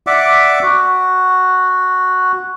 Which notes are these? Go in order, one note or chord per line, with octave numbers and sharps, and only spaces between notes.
D5 E5 F#5 D6
F#4